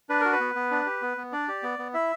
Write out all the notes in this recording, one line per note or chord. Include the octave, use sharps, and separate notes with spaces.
D4 B4
F#4 A#4
B4
B3
B3
D4
G4
B3
B3
D4 D5
G4
B3
B3
E4 E5